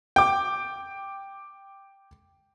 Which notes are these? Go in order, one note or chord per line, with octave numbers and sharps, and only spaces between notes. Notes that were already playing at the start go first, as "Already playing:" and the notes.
G5 D6